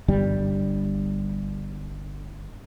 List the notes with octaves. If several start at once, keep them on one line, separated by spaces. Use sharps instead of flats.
G1 G2 G3